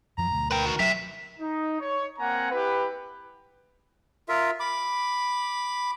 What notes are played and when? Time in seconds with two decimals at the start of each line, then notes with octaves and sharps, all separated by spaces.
0.18 F#2 F3 A#5
0.31 D2 B2
0.51 A#4 B4 G5
0.66 D#3 F#4
0.79 F#3 D4 G4 E5 B6 E7
1.40 D#4
1.80 C#5
2.19 A#3 C4 F#5 G#5 A#5
2.52 E4 G4 B4
4.29 F4 A#4 E5
4.60 B5 D6